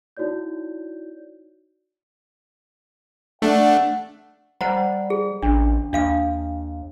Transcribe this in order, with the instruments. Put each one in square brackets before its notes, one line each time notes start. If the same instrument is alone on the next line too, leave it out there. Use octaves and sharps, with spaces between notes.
[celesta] D#4 E4 F#4 C#5 D5 G6
[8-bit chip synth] A3 D4 [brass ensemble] F#5
[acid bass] G3 [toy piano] C5 F#5 A#5
[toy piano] G#4
[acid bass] A1 [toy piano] D4
[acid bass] D#2 [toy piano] D4 F5 D#6